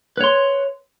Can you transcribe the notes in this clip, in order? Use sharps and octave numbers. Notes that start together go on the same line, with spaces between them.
B4 C#5 C6